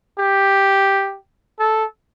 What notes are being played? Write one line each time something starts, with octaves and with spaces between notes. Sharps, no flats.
G4
A4